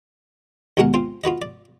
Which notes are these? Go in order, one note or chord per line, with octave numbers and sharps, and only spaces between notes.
D#2 B2 G#3 F#4 A#4 F#5
C4 F4 C5
F4 F#4 B4 D#5
D5